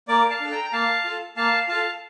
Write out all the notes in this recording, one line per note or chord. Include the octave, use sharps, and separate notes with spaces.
A#3 A#4 D5
F5 A5
D4 A4
G5 A#5
A#5
A#3 F5 A5
F4 A4
A#3 F5 A5
F4 A4 F5 A5